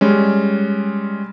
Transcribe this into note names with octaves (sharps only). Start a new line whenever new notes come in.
G3 G#3 C#4